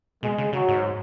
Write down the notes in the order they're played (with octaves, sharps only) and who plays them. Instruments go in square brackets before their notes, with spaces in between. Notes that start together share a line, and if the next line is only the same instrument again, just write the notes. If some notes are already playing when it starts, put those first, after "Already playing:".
[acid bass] B2 [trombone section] G#3
[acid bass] C#3
[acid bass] C#3 [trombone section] F#3
[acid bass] G#2